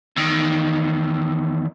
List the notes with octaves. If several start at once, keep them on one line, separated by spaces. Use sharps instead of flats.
E2 D#3